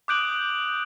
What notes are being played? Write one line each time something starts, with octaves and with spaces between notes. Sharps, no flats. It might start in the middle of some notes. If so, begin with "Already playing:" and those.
D6 D#6 F#6 G6 D7 F#7